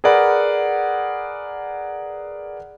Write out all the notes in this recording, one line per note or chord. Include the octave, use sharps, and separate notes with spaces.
G#4 A#4 B4 D5 F#5 B5